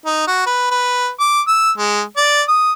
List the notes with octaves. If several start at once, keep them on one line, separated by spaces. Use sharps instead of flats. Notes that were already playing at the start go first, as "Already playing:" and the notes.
D#4
F#4
B4
B4
D6
E6
G#3
D5
D#6